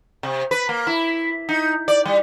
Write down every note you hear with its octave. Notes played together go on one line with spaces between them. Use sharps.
C3
B4
A#3
E4
D#4
D5
G3